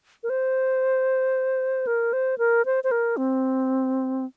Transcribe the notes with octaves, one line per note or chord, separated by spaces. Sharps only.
A#4
C5
A#4
C5
A#4
C5
C5
A#4
C4